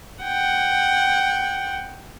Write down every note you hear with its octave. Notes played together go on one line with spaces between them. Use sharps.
F#5 G5